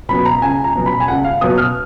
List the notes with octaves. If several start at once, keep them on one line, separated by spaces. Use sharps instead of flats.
B2 F#3 B3 B5
A#5
C#2 G#5
A#5
B2 F#3 B3
B5
G#5
C#2 F#5
F5
B2 F#3 B3 D#6
F6